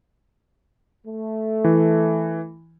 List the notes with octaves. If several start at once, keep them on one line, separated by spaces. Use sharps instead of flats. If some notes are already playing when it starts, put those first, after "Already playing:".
A3
E3